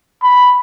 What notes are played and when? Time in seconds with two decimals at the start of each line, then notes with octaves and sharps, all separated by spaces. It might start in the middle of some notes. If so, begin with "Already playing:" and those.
0.22 B5